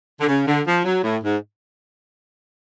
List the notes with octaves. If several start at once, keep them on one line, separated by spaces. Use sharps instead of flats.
D3
C#3
D3
F3
F#3
A2
G#2